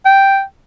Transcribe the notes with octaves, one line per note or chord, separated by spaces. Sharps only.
G5